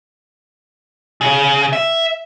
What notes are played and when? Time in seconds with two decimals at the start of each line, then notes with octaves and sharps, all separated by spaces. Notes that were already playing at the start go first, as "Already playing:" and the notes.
1.21 C#3
1.73 E5